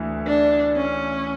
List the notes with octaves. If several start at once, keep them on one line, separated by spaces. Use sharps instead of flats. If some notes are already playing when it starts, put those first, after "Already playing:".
Already playing: D2 E3
D4
C#4